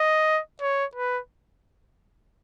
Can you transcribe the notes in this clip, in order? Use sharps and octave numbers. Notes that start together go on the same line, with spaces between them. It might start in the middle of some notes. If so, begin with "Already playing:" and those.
Already playing: D#5
C#5
B4